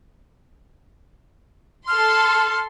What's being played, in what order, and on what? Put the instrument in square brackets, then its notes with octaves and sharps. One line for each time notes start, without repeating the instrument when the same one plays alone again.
[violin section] A4 C6 [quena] F6